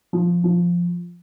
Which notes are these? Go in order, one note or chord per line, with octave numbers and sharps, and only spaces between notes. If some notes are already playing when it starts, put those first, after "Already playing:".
F3
F3